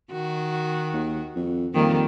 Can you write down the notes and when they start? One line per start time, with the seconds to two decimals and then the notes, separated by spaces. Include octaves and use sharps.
0.12 D#3 F#4
0.93 D#2
1.35 F2
1.74 F2 D#3 G3 A#3